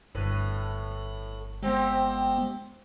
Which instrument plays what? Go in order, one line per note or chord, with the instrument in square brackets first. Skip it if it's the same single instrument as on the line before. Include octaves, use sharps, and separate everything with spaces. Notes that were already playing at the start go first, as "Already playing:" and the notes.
[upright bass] G1 [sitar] A2 B4
[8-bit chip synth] G#3 B3 [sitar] C4 G4